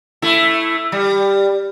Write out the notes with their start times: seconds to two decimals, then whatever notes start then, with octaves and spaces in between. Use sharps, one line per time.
0.22 A3 E4
0.92 G3